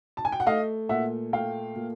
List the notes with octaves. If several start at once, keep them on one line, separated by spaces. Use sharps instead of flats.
A5
G#5
G5
F#5
A3 D#5 F5
A#2 E5 F#5
A3 F5 G5
A#2